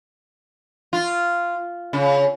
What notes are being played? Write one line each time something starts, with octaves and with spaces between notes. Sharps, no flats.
F4
C#3